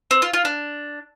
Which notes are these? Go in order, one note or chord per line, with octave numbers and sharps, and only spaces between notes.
C4
F4
F4
D4